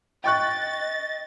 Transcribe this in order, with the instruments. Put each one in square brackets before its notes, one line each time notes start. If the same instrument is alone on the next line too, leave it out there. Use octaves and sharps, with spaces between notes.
[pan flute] D#5 [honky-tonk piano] G5 C#6 F#6 [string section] A6